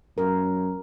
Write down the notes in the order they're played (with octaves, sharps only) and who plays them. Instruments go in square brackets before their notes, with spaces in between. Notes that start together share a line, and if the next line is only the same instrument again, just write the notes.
[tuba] F#2 [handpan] A#4